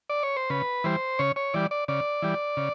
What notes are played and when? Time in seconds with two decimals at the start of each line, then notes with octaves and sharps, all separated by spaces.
0.10 D5
0.23 C#5
0.37 C5
0.50 C#3 B4
0.84 E3 G3 C5
1.19 C#3 C#5
1.36 C#5
1.54 E3 G3 D5
1.71 D5
1.88 C#3 D5
2.22 E3 G3
2.57 C#3